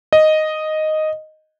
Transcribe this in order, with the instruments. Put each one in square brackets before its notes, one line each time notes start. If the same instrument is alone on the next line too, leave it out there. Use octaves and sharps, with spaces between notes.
[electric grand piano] D#5